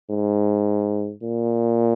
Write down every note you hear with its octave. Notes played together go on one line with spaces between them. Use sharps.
G#2
A#2